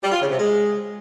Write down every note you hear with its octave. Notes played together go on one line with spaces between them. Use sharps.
G3
F4
C#3
C3
G#3